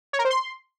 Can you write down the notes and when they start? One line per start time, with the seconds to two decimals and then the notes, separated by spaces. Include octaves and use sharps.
0.13 C#5
0.19 A#4
0.25 C5
0.30 C6